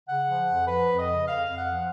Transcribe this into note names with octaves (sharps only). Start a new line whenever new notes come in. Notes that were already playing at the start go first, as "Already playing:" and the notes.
C#3 F#5
F3
F2
F3 B4
F2
D#5
C#3
F2 F5
F2
F#5
F3